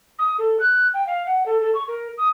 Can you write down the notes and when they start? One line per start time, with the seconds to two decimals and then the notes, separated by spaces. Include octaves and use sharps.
0.19 D#6
0.38 A4
0.60 F#6
0.94 G5
1.07 F5
1.26 F#5
1.46 A4
1.61 A4
1.75 C#6
1.88 A#4
2.18 D#6